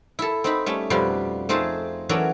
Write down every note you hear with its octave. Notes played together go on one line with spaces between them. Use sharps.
E4 A4
C4 D#4 B5
G3 A3 C#4
F2 B2 F3 G3 B4 B5
A3 C4 D#4 F4 G#4 A5
E3 F#3 C#4 A4 A#4 D5